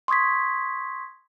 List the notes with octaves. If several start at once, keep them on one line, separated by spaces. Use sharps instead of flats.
C6 C#6 D#6 G#6 B6